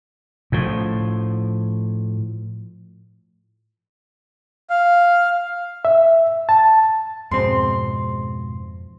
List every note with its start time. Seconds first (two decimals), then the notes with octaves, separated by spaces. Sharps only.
0.52 A2 F3
4.70 F5
5.85 E5
6.49 A5
7.31 F2 G#2 B2 C4 C6